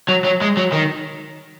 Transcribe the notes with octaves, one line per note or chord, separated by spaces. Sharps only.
F#3
F#3
G#3
F#3
D#3